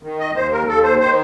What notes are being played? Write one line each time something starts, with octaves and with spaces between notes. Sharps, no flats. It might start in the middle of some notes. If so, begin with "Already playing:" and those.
D#3
D#5
D#2 C5
A#4
D#2 A4
C5
D#3 C5